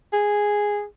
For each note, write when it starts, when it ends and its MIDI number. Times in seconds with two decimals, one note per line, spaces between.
0.13 0.84 68